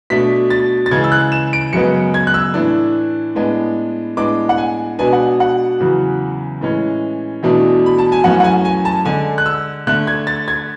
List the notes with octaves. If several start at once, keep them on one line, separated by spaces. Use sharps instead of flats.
B2 A3 D4 B6
A6
A6
C#3 E3 G#3 G#6
E6
F#6
E7
D7
F#2 C#3 G#3 B3 C#7
G#6
F#6
E6
A2 E3 A3 D4
A2 G#3 B3 D4
A2 G#3 B3 D4 D6
F#5
G#5
B2 G#3 B3 D4 G#5
F#5
F#5
E2 C#3 F#3
A2 E3 G#3 C#4
E2 B2 A3 D4
B5
A5
G#5
F#2 E3 A3 C#4 F#5
F#5
G#5
G#5
A5
D3 G#3 D4 G#5
F#6
E6
D3 A3 D4 F#6
G#6
A6
G#6